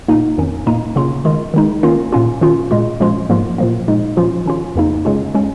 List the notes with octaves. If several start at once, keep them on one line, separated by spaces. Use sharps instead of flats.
A#2 A#3 D#4
F2 D#3 C#4
A#2 A#3 D#4
C#3 A#3 C#4 F4
D#3 G#3 F4
D#3 G#3 D#4
D#3 A#3 C#4 F4
A#2 A#3 C#4 F4
D#3 C#4 F4
A#2 G#3 F4
A#2 F3 G#3 C#4 F4
G#2 F3 A#3 F4
A#2 F3 A#3
A#2 G#3 D#4
A#2 F3 C#4 F4
D#3 C#4 F4
F2 C#3 A#3 D#4
C#3 G#3 C#4 F4
G#3 C#4